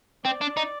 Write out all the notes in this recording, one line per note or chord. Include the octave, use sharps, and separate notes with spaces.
C4 D5
D4
D#4